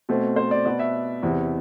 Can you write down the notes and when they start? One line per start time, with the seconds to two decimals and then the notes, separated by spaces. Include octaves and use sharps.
0.09 B2 A3 C4
0.36 C5
0.51 D5
0.66 B2 B3 D5
0.79 E5
1.23 E2 C3 E3